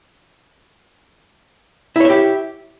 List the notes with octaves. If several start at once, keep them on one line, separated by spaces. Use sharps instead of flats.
E4 G4 C#5 E5